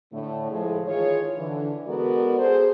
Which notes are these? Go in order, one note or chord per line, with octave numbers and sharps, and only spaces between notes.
A2 D3 A3
A2 F3 G#3 G#4 A4
D#3 E3 F4 G#4 C#5
D3 E3
G#3 B3 F#4 A4 A#4 D5
G#4 A4 C5